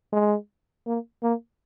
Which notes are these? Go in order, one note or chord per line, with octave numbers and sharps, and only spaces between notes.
G#3
A#3
A#3